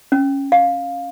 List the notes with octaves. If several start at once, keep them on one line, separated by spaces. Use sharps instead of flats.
C#4
F5